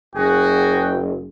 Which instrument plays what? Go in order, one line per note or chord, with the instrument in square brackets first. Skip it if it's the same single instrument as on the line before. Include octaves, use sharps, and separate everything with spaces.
[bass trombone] F#1 [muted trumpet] F#4 [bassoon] G#4 [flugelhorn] G5